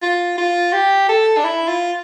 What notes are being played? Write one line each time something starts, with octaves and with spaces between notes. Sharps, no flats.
F4
F4
G4
A4
D4
E4
F4